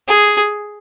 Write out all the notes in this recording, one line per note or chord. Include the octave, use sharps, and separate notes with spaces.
G#4